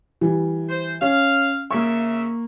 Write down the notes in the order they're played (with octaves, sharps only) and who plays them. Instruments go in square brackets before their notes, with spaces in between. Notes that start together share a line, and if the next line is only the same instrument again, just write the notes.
[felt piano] E3 G3
[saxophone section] C5
[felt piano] C#4 [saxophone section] F5
[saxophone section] C#3 E5 [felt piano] A#3 C#6